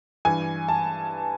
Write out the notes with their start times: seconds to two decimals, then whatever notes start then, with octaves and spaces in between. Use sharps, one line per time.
0.25 G2 E3 G#5
0.68 A5